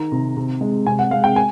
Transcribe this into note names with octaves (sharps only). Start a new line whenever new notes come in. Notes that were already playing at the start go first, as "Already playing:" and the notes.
Already playing: D#3 A#5
C3
C3
G#3
C3 G#5
F#5
G#3 F5
G5
G#5